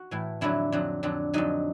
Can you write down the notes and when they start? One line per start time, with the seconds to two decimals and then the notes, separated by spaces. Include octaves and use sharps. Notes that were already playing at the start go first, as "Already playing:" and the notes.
Already playing: F#4
0.11 A2 E3
0.41 F2 D3 F#3 E4
0.72 F2 D3 F#3
1.03 F2 D3 F#3
1.34 F2 D3 F#3 D#4